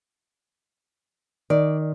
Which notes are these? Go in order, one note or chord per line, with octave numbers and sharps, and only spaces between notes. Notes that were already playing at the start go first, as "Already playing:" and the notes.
D#3 D5